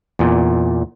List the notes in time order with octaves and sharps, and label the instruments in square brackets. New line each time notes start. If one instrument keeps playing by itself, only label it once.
[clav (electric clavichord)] E2 A#2